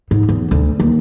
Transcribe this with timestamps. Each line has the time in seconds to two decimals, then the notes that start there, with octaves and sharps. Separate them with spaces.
0.11 G#2
0.29 E2
0.51 D2
0.80 D#2